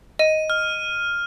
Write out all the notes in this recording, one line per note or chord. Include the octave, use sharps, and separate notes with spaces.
D#5 D#7
F6